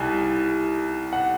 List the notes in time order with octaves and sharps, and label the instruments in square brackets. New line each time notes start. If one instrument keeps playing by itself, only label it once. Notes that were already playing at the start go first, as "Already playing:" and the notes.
Already playing: [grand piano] C2 G3 G#5
F#5